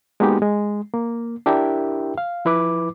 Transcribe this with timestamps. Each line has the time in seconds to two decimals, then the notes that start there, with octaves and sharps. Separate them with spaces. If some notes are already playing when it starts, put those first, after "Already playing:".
0.20 G#3 A#3 B3 D#4 F#4 G4
0.42 G#3
0.94 A#3
1.46 D4 E4 G4 A#4 E5 G5
2.18 F5
2.45 F3 E4 B4 D6